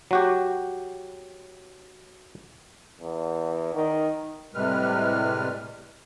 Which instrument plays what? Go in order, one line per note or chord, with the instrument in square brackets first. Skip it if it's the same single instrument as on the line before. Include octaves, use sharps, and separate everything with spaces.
[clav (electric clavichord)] F#3 F#4 G4
[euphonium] E2
D#3
[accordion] A2 C3 G3 G#3 B4 F6